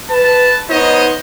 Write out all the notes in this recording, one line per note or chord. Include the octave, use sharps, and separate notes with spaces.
B4 A5
B3 D#4 C5 C#5 D#5